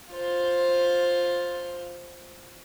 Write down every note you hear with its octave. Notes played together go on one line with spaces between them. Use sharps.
F4 C5